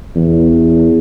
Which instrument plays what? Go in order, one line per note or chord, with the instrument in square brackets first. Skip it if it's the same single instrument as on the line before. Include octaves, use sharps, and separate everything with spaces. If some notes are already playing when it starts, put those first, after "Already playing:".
[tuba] E2